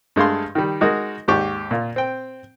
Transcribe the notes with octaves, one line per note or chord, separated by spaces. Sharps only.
G2 G#3 A3 F5 C6
D#3 G3
G#3 D#4 F#4 A#4
D#2 G#2 G4 D5 C#6
A#2 F4
C4 G5